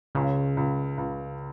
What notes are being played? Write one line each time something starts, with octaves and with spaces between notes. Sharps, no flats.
C#2 C#3
C#2
C#2